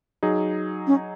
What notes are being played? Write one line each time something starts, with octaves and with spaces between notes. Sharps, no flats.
F#3 D#4 G#4
C#4